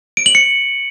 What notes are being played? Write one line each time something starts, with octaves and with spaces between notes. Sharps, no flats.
D7
F#7
C#7